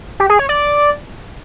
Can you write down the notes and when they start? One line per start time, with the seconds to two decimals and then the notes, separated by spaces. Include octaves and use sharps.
0.20 G4
0.29 G#4
0.39 C#5
0.49 D5